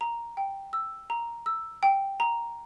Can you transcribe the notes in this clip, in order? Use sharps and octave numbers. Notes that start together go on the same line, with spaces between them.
A#5
G5
E6
A#5
E6
G5
A#5